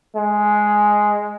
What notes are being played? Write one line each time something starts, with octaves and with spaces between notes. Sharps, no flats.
G#3